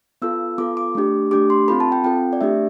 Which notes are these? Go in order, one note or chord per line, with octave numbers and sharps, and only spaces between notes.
B3 F4 A4 E6
B3 F4 A4 D6
D6
A3 D4 G4
A3 D4 G4 D6
C6
C4 F4 A4 B5
A5
G5
C4 F4 A4 G5
D5
A3 D4 G4 E5